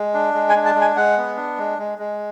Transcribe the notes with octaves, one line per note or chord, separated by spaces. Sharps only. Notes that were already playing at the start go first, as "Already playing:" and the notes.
Already playing: G#3
D4
G#3
G#5
D4
A5
G#3
G#5
G#3 F#5
B3
D4
G#3
G#3
G#3